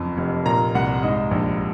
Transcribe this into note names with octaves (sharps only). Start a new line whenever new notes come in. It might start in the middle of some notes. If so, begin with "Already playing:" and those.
Already playing: F#1 F2
F1
A#2 A#5
C2 F#5
G#2 D#5
A#1